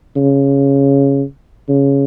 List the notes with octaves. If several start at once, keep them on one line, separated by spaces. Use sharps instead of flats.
C#3
C#3